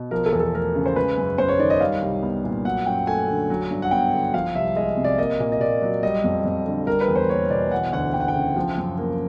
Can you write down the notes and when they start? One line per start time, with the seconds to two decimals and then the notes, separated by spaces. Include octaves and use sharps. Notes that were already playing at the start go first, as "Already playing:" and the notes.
Already playing: B2
0.11 F3 A#4
0.26 A4
0.33 E2
0.40 A4
0.53 A3 A#4
0.75 C#3
0.86 C5
0.96 G#3 B4
1.17 F#2
1.38 F#2 C5
1.48 C#5
1.59 D#3 D5
1.70 D#5
1.81 G3 F5
2.02 C2
2.22 B3
2.44 A#2
2.65 F#3 F#5
2.86 F#2 G5
3.07 A3 G#5
3.28 D3
3.50 F#3
3.71 G2
3.82 F#5
3.91 B3 G5
4.13 D3
4.34 F3 F5
4.55 C2 E5
4.76 G#3 D#5
4.97 C3
5.04 D5
5.18 A#3 D#5
5.40 A#2
5.52 D#5
5.60 A#2 D5
5.82 F#3
6.03 G3 D#5
6.24 F2
6.45 F2
6.66 D3
6.87 G3 A#4
7.01 B4
7.08 E2
7.16 C5
7.29 A#3 C#5
7.50 B2 D5
7.71 E3 F#5
7.93 D2 F#5
8.13 D2 G5
8.20 F#5
8.28 G5
8.35 C#3
8.56 F3
8.77 F#2
8.99 A#3